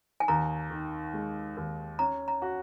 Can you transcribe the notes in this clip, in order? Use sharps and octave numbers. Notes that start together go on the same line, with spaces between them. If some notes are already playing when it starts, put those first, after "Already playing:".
G#5
D#2 A#5
D#3
G#3
D#2
C#4 A#5
A#5
F#4